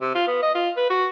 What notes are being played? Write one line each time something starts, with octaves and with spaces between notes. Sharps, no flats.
C3
F4
B3
D#5
F4
B4
F#4